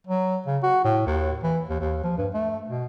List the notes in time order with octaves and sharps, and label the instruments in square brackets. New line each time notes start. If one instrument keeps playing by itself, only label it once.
[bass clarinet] F#3
C#3
F#4
A2
D#2
E3
D#2
D#2
F3
G2
A3
B2